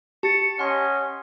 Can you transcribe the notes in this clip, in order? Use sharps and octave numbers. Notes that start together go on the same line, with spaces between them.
G4 A5 A6 C#7
C#4 D#5 F#5 C6